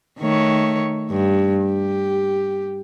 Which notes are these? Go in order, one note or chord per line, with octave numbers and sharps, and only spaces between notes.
D#3 A3 C#5
G2
G4